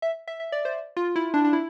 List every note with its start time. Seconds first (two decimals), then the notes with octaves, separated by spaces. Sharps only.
0.02 E5
0.28 E5
0.40 E5
0.52 D5
0.65 C5
0.97 F4
1.16 E4
1.34 D4
1.45 D4
1.53 E4